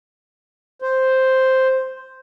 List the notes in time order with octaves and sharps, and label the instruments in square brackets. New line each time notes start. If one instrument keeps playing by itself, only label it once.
[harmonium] C5